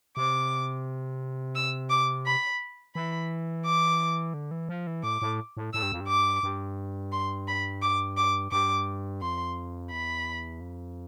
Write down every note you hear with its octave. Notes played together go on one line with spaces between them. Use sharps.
C3 D6
E6
D6
B5
E3 B5
D6
D3
E3
F3
E3
A2 D6
A2
A2
A2 E6
G2
F2
G2
D6
G2
C6
B5
D6
D6
G2 D6
F2 C6
E2 B5
F2